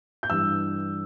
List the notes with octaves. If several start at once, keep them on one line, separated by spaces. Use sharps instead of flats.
G6
G2 E3 E6